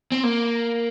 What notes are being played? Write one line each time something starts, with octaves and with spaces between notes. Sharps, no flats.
C4
A#3